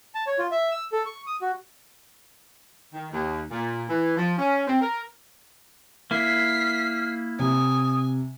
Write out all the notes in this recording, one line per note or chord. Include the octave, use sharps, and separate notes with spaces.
A5
C#5
F4
E5
E6
A4
C#6
D#6
F#4
D#3
D#2
A#2
E3
F3
C#4
C4
A#4
A#3 E4 F6 B6 C7
C3 G#5 D#6